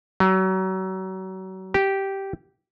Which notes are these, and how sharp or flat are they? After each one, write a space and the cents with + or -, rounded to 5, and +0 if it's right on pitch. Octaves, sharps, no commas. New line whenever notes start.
F#3 +35
G4 -10